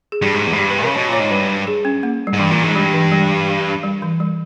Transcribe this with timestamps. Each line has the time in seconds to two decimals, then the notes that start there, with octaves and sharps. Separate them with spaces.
0.12 G#4
0.22 G2 G4
0.34 G#2
0.47 E2
0.53 G#2
0.58 G2 G4
0.70 B4
0.82 C#3 A#4
0.94 B2 C#5
1.08 A#2 C#5
1.19 G#2
1.31 G2 B4
1.67 G#4
1.85 C#4
2.03 A#3
2.27 G3
2.33 G#2
2.39 G2 E3
2.51 A#2
2.63 G#2
2.69 G#3
2.75 G2 G3
2.94 E3
3.11 G3
3.83 G3
4.02 E3
4.20 G3